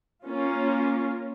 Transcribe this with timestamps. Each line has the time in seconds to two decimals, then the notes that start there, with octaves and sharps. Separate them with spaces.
0.24 A#3 C#4 F4